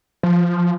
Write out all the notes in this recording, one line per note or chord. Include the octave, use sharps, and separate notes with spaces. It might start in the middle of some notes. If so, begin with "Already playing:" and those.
F3